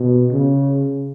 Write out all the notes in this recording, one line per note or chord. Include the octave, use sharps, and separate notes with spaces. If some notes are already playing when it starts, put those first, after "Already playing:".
Already playing: B2
C#3